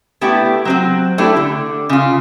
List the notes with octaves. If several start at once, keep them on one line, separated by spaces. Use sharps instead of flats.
A3 B3 D4 E4 G4
F#3 C4 F#4
A3 D4 E4 G4
D3
C#3 F4